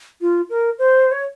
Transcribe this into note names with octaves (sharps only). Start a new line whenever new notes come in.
F4
A#4
C5
C#5